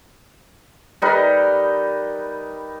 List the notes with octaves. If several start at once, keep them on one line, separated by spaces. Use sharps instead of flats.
G3 D#4 A#4 B4